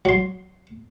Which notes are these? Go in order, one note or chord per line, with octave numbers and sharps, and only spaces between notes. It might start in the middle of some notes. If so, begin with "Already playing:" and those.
F#3 C6